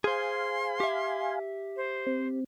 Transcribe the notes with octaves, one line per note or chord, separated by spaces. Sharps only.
G#4 C5 F5 G#5 C6
G4 E5
C5
C4